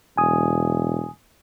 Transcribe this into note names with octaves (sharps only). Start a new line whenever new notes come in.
E1 G#5 D#6